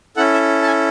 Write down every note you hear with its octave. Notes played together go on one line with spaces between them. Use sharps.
C#4 E4 A4 F#5
E5
A5
G#5